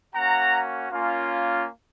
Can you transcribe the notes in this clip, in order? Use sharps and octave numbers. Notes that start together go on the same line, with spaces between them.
A#3 C#4 F#4 F#5 A#5
A#3 C#4 F4